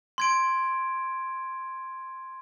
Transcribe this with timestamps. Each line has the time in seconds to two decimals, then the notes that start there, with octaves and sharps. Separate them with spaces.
0.18 C6 G#6 D7